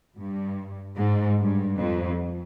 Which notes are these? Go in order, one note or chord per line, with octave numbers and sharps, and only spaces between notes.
G2
G#2
G2
F2